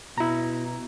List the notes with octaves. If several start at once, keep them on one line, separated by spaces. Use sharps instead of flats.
B2 E4 A#5